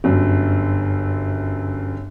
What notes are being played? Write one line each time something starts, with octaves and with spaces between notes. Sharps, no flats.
G1 F#2